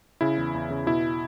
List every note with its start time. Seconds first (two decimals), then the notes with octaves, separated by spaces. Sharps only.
0.21 C#3 E4
0.38 E2
0.54 E2
0.70 C#3
0.87 B2 E4